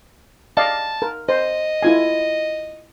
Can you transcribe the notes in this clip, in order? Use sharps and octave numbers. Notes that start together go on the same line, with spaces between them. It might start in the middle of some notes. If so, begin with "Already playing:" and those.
D5 D#5 F5 A5
A#4
C5 D#5
E4 F4 G#5